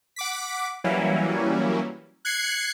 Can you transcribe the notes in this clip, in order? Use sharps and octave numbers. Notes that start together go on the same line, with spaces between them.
F#5 D6 B6
E3 F#3 G3 A#3 C#4 E4
F#6 G#6 C7 C#7